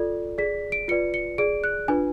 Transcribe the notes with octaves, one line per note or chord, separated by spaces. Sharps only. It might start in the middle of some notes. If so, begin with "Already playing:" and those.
Already playing: F4 A4 D5
G#4 D5 B6
D7
F4 B4 D5 C#7
C#7
G#4 D5 D7
F#6
D4 F4 B4 G#5